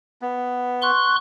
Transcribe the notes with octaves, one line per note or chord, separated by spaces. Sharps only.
B3
C6 C#6 F#6